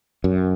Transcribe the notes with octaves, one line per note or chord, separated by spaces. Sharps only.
F#2